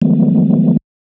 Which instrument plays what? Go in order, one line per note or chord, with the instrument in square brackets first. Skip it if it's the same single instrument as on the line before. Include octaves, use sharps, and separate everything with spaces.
[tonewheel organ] D#3 F3 F#3 G#3 A3 B3